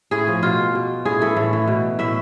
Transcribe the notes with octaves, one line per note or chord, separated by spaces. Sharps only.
A2 G#4
F3
B2 F4
B2
A2 G#4
E3 A4
A2
E3
B2
A2 E5